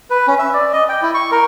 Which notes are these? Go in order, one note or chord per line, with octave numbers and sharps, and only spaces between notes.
B4
C#4
E5
D5
D#5
G5
E4
C#6
A#4